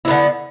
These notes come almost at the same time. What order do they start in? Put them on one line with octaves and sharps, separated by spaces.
E4 B3 D3